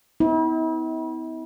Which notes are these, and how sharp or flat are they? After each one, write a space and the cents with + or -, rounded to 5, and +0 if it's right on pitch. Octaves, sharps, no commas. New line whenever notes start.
B3 +35 E4 -40